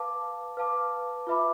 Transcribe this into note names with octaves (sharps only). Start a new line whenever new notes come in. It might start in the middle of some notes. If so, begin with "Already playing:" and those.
Already playing: B4 F5 A5 D6
B4 F5 A5 D6
F4 B4 E5 B5 D6